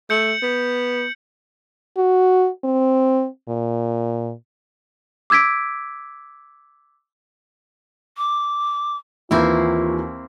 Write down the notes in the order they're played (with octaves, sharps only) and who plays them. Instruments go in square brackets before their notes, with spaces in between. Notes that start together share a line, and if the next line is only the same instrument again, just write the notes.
[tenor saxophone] A3 [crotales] G6 C#7 F#7
[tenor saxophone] B3
[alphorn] F#4
C4
A#2
[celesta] D6 E6 G#6 B6 D7
[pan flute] D6
[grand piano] D#2 E3 [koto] A#3 C4 E4 [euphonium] F4